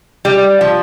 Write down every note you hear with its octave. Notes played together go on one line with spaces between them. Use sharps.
G3
F3